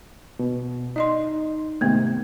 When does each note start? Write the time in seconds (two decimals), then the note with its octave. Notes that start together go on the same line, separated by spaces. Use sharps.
0.39 B2
0.96 D#4 D5 D#5 C6
1.81 G#2 C3 D#3 A3 B3